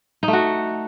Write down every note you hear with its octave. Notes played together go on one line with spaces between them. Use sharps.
D#4
A3
F#4